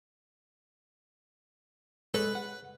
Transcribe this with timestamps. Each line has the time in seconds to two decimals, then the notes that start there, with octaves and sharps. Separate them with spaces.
2.14 G#3 A4 B4 C#5
2.35 F#5